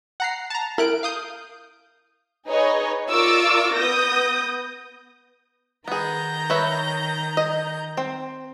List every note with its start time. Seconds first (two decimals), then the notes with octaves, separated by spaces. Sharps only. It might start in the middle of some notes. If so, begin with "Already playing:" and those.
0.20 F#5 A#5 C7
0.50 A5 A#5
0.78 E4 A#4 F#6 D7
1.03 F5 D#6 G6
2.47 D#4 G#4 B4 C#5 D#5
3.09 F4 A#4 D5 C#6 D6 E6
3.74 B3 D#6 G6 A#6
5.88 D#3 B3 G#4 A#5 G6
6.50 B4 C#5 E5
7.37 D#5
7.97 C4